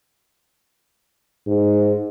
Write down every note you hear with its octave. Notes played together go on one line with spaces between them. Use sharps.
G#2